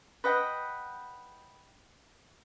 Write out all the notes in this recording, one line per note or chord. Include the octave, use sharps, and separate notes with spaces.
B4 D#5 F#5 G5